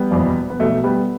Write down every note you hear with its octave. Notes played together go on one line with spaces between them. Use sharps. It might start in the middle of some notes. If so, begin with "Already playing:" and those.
Already playing: G3 B3
F#1 E2 B2
B3
B1 B2 F#3 A3
G3 B3